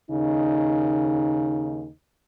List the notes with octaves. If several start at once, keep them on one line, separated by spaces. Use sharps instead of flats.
D#2 C#3 D#4